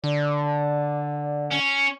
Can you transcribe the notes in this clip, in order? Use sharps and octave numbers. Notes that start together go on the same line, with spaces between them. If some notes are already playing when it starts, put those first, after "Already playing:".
D3 D5
C#4